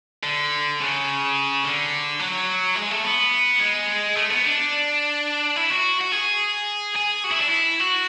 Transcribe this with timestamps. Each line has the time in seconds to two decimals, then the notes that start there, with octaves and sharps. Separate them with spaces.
0.23 D3
0.80 C#3
1.64 D3
2.20 F#3
2.76 G#3
2.91 A3
3.04 B3
3.60 G#3
4.16 A3
4.30 B3
4.44 D4
5.56 E4
5.70 F#4
6.01 F#4
6.12 G#4
6.96 G#4
7.24 F#4
7.32 E4
7.40 D4
7.48 E4
7.80 F#4